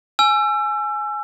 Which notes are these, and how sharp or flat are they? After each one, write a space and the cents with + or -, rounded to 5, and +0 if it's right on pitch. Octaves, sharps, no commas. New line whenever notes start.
G#5 +15 E6 +30